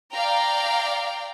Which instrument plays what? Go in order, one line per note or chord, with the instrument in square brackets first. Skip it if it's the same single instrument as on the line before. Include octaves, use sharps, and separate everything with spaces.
[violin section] D5 F5 G5 A#5